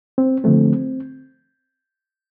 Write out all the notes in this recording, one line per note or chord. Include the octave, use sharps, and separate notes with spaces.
C4
D3 F3 A3 C4